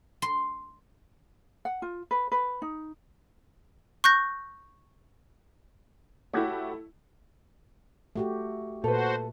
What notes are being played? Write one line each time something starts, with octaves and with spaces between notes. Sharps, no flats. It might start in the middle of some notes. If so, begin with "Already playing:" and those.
C6
F#5
F4
B4
B4
D#4
C#6 F#6 G6 A#6
A3 E4 F#4 G4 C#5
A3 F#4 G4
A#2 F#4 A4 B4 C5